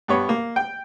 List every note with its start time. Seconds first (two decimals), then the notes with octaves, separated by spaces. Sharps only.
0.08 G2 B3 C#5
0.29 A#3
0.56 G5